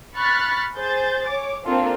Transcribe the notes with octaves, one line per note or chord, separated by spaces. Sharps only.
B5 C#6 F6 F#6 A6 B6
G#4 C5 G6 A6
C#5 D6
A#3 C4 D4 F4 A4